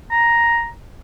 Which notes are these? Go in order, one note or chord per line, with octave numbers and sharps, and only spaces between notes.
A#5